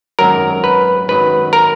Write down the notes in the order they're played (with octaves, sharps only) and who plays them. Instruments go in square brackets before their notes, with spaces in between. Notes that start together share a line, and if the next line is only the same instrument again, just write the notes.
[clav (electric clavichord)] G#1 F#2 D#3 F#3 A#4
B4
G#1 F#2 D#3 F#3 B4
A#4